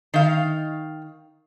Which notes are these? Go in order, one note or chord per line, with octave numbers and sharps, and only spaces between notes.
D#3 F5